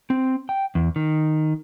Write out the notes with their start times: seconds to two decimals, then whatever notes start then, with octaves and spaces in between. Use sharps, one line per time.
0.10 C4
0.49 G5
0.75 E2
0.96 D#3